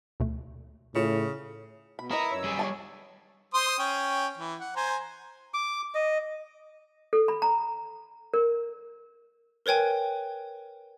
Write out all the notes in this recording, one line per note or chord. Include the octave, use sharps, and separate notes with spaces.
D2 B2 A3
A2 C#3 F4 C#5 C#7
B2 B5
E4 A#4 B4 D#5 A#5 C#6 D#6
F#2 C#5 E6
G3 G#4
C#5 G#5 A5
C5 C6 D#6
C#4 G5
E3
F#5
C5 G#5 A#5
D6
D#5
A4
B5
A#5
A#4
A#4 B4 C#5 G5 G#5